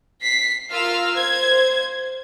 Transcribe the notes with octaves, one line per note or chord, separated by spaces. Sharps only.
B6 C7
F4 A#4 F5 E6 F6
C5 G#6